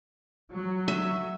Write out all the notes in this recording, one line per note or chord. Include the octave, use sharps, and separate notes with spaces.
F#3
E5